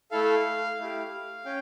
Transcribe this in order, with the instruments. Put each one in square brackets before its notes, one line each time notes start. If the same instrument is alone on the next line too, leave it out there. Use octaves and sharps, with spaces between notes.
[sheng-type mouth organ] A3 E4 A4 F5
A3 E4 G4
C#4 G5